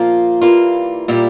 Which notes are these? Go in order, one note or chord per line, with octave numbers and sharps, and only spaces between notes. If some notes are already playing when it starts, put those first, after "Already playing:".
Already playing: A#2 F3 A#3 F4
E3 G3 A#3 F4
A#2 G3 A#3 E4 G4